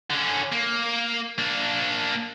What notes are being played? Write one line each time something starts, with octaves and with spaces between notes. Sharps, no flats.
D3 C#4
A#3
A#3 D4